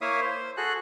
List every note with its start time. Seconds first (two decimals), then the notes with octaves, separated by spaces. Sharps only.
0.01 A#3 E4 C#5 E5 F5 D#6
0.21 C5
0.57 F#4 G#4 A4 F#6